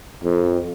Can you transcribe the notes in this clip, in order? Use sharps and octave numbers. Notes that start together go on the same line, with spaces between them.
F2